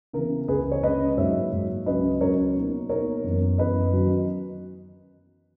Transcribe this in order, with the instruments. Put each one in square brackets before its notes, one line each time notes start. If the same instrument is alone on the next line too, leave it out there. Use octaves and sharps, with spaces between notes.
[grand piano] C#3 E3 B3 A#4
C#2 C#3 G#3 C#4 G#4 B4
C#5
C#2 C#3 G#3 C#4 B4 D#5
G#2 F#3 A#3 C#5 E5
G#2 F#3 A#3
C#2 C#3 F#3 C#4 B4 D#5
C#2 C#3 F#3 C#4 A#4 C#5
B2 A#3 D#4
B2 A#3 D#4 A#4 C#5
F#2 E3 B3
F#2 E3 B3 B4 D#5
D#3 F#3 C#4